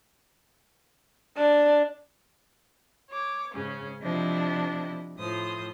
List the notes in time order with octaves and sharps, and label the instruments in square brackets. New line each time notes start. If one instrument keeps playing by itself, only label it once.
[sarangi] D4
[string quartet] C#5 D6
G#2 C#3 C#4
C3 F3 D4 E4 D#5
A2 F3 C5 D#6